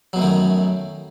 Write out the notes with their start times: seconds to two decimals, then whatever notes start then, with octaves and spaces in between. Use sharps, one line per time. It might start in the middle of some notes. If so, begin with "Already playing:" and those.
0.13 F#3
0.16 B2
0.19 A3
0.22 D#3
0.24 F#2